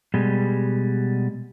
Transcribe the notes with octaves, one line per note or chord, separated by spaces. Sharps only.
B2 G3 G#3